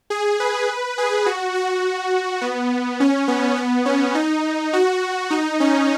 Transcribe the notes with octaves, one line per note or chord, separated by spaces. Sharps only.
G#4
B4
G#4
F#4
F#4
B3
C#4
B3
B3
C#4
D#4
F#4
D#4
C#4